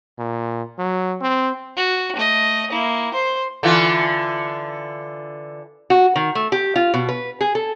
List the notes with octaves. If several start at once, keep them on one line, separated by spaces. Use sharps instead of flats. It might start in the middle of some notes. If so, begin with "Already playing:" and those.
A#2
F#3
C4
F#4
A3 D#5
A#3 E4
C5 C6
D3 E3 F4
F#4
D#3
A3
G4
F4
B2
B4
G#4
A4